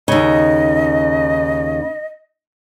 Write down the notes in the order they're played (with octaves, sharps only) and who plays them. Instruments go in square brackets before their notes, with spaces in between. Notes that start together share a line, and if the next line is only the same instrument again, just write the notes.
[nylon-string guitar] D#2 C#3 [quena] D#5